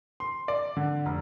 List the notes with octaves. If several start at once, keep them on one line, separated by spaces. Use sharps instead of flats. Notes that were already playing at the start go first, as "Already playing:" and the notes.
C6
D5
D3
F1